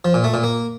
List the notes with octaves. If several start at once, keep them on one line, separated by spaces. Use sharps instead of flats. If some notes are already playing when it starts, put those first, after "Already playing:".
F3
A#2
A3
A#2
A#3